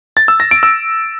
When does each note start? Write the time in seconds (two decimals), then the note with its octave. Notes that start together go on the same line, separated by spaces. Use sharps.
0.17 A6
0.28 E6
0.40 A#6
0.51 D7
0.63 E6